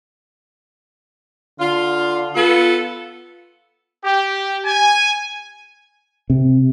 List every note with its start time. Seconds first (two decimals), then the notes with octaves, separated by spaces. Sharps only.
1.60 D3 F4
2.35 B3 F4 A4
4.05 G4
4.65 G#5
6.30 C3